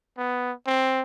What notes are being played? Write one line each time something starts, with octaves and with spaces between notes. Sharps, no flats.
B3
C4